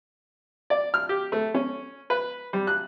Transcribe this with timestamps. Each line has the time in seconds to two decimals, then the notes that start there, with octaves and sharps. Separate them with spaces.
0.70 D5
0.94 F6
1.09 G4
1.32 A3
1.54 C#4
2.10 B4
2.53 G3
2.67 F#6